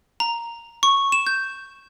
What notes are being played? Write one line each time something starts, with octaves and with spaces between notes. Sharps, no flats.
A#5
C#6
E7
G6